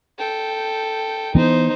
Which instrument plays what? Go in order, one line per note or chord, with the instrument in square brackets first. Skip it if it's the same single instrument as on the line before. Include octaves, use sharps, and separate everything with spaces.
[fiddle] A4 G5
[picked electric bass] E3 B3 [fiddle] D#4 C5